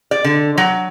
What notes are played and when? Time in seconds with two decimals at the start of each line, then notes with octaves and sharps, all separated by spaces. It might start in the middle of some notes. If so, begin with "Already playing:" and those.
0.11 D5
0.24 D3
0.58 F#3